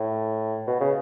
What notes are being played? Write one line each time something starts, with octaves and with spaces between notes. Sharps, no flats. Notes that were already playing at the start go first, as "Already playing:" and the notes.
Already playing: A2
B2
C#3